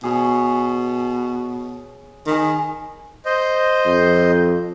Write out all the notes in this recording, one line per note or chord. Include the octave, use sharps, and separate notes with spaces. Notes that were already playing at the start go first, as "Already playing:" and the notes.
B2 G#4 C#5
D#3 G#4 B5
C5 D#5
F2